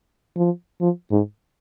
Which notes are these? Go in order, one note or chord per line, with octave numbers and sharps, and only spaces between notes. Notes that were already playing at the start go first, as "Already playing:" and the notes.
F3
F3
G#2